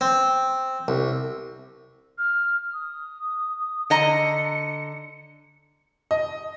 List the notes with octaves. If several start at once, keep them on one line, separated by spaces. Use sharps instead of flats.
C4
C2
F6
D#6
D3 D#5 A#5 C#7
D#5